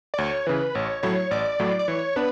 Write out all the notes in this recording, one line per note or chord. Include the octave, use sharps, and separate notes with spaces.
D5
D2 C#5
C#3 E3 B4
A1 C#5
A2 F#3 A3 E4 C#5
A1 D5
A2 F#3 A3 E4
D5
E3 C#5
B3 D4 B4